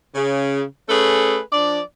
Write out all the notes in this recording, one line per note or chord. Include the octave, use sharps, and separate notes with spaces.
C#3
A3 C#4 G#4 A4 B4
F3 D4 D5